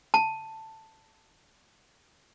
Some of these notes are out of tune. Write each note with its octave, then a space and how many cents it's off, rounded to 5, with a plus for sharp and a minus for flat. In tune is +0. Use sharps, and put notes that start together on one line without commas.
A5 +10